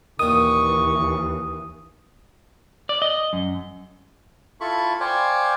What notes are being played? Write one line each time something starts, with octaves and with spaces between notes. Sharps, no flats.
D#2 A#2 D#3 E3 C#6 D#6
D5
D#5
F#2
E4 F4 A4 B5 C#6
C5 D5 F5 G5 G#5 C#6